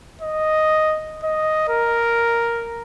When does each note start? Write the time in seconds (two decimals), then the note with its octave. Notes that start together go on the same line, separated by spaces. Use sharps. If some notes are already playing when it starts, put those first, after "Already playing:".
0.22 D#5
1.24 D#5
1.69 A#4